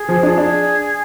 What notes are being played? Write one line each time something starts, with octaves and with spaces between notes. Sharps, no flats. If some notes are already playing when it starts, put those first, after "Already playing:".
Already playing: G#4
F3
D4
D4 G#4